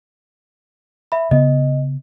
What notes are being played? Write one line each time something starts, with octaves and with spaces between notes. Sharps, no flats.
E5 B5
C#3 B3 D#5